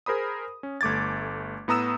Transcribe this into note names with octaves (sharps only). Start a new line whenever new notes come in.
G#4 A#4 C5 B5 D#6
C#4
G1 A3 D6 G#6 A6
A2 B3 A#5 D#6 E6 E7